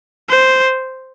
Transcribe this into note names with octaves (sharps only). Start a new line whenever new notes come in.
C5